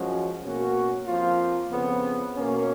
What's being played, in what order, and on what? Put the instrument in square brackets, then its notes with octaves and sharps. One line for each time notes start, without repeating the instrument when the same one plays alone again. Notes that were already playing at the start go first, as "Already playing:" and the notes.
Already playing: [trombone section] F#2 F3 G#3 C#4 F#4
B2 A#3 C#4 F#4
F2 F3 A#3 F4
F2 C#3 F3 B3
B2 A#3 C#4